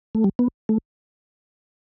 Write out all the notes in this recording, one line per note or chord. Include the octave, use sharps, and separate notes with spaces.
A3
G3
B3
A3